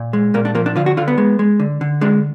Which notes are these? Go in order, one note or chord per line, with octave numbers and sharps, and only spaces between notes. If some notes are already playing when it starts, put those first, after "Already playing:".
Already playing: A#2
G#3
A#2 A#3
D4
F3 A#3
D4
D3 F4
F#4
D3 F4
B3
G#3
G#3
D3
D3
G#3 D4